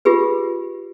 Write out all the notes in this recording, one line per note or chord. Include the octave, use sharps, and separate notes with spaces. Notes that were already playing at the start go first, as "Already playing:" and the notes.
F4 G4 G#4 B4